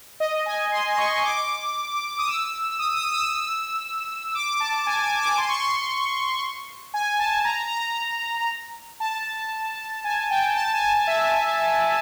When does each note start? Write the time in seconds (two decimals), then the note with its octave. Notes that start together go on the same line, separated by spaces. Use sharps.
0.20 D#5
0.46 G#5
0.72 C6
0.93 C6
0.98 C#6
1.24 D6
2.19 D#6
2.27 E6
2.79 D#6
2.97 D#6
3.14 E6
3.31 E6
4.35 D6
4.60 A5
4.87 G#5
5.03 G#5
5.21 D6
5.38 C6
5.49 C#6
5.60 C6
6.94 G#5
7.19 A5
7.44 A#5
7.71 A#5
9.00 A5
10.04 G#5
10.30 G5
10.56 A5
10.73 G#5
11.07 E5